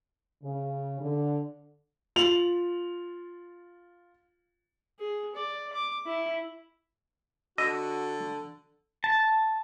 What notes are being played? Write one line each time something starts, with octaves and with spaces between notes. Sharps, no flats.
C#3
D3
F4 F7 F#7
G#4
D5
D6
E4
D3 F#4 D#5 E6
A5